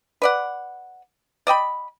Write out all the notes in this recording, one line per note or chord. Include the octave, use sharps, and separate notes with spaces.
B4 D5 F#5
D5 D#5 G5 B5